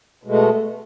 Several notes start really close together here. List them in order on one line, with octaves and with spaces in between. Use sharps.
B2 G#3 A3